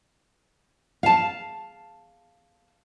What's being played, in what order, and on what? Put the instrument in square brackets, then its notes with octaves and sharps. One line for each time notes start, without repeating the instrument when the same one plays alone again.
[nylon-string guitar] F5 A5